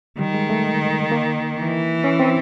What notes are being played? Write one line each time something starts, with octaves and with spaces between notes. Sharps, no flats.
D#3 G3
G#3
A3
A#3
E3
C#4
C4